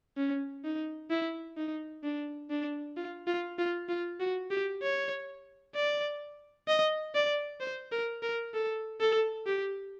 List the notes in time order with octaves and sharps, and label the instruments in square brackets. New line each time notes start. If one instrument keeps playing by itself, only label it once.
[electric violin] C#4
D#4
E4
D#4
D4
D4
F4
F4
F4
F4
F#4
G4
C#5
D5
D#5
D5
C5
A#4
A#4
A4
A4
G4